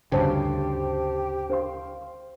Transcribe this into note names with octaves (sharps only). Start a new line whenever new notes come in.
D2 G2 C#3 G4 C5 A5
C5 F5 C6